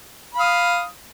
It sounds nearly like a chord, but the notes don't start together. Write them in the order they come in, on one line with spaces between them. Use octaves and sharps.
B5 F5 D#6